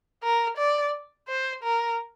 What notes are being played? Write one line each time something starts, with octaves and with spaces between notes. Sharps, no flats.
A#4
D5
C5
A#4